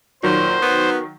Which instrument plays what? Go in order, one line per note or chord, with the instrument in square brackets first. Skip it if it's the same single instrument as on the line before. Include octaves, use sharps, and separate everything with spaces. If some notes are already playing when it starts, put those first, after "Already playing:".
[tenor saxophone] A#2 [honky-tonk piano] D#3 F#3 [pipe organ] C5
[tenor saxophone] B3